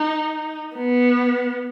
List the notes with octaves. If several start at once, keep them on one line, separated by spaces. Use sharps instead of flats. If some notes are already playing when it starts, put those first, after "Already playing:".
Already playing: D#4
B3